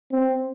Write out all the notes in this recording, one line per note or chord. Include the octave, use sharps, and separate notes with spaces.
C4